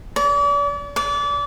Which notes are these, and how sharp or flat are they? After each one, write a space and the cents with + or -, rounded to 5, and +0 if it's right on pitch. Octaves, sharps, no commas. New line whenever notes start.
D5 -40
D5 -30